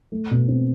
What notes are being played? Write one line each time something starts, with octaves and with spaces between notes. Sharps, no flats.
A3
B2
C4